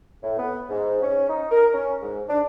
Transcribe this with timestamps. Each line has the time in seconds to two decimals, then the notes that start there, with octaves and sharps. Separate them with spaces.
0.23 A2
0.38 B3
0.69 G#2
1.01 C#4
1.29 D#4
1.51 A#4
1.74 C#4
2.02 G#2
2.29 D4